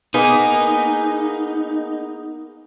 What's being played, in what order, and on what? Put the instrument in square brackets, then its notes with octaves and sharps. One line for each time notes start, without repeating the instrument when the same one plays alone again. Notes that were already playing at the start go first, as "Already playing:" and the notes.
[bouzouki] A#3 B3 G#4 [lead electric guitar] D#4